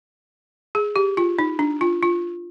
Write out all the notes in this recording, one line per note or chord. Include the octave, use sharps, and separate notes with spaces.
G#4
G4
F4
D#4
D4
F4
F4